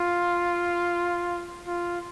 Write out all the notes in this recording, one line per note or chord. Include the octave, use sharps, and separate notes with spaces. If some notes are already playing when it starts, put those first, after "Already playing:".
Already playing: F4
F4